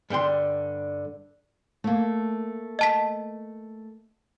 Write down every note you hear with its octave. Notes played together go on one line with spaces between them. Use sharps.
G2 D3 G5 C6
A3 A#3
D#5 A5 B6